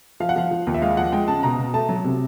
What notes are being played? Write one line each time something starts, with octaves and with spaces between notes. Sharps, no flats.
F3 F5
F#5
F3 F5
F3
D#2
E5
G#3 F5
F3 F#5
G#3 G5
C#3 A5
B2 A#5
B2
A3 A5
F#3
C3